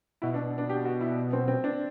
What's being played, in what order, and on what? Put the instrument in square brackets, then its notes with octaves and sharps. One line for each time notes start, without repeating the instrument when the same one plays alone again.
[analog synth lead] B2 [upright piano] E4
[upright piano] D4
D4
G4
F#4
E4
C4
C4
D4